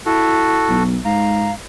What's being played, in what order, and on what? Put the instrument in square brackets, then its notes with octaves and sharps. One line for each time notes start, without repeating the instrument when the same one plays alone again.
[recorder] E4 [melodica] F#4 A4
[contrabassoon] B1
[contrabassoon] G#2 [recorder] F5 [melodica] A#5